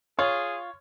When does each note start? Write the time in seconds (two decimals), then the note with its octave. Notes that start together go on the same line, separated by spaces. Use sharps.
0.19 F4 G#4 C#5